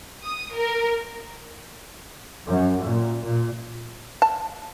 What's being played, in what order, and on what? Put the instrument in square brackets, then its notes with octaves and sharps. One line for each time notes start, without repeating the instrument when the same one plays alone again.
[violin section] D#6
A#4
[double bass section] F#2
A#2
A#2
[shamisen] A5